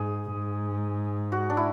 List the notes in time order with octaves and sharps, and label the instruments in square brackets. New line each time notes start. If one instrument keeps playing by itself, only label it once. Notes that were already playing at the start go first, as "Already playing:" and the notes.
Already playing: [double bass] G#2 [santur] G#4
[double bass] G#2
[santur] F#4
D4
E4